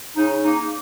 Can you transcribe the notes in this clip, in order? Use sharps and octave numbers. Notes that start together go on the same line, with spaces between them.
C#3 D#4
A#3 D#4